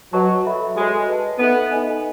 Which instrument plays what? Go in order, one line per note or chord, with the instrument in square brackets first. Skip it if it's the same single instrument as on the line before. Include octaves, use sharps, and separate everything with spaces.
[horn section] F#3 [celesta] F#4 B4 D#5 A5 C#6
[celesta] F#4 A4 E5 B5
[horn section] G#3 [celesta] F#4 A4 C#5
[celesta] B4 D#5 A5
[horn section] B3 [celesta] D#4 A4 E5
[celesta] D#4 A4 D#5 G#5